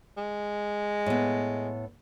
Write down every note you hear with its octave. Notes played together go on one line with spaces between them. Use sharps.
G#3
A2 B3